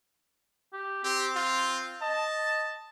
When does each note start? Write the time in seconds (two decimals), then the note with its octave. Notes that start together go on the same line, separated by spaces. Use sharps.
0.73 G4
1.04 C4 G4
1.36 F4
2.02 D#5 A5